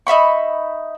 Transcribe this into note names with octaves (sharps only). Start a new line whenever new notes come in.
D#4 E5 B5 C#6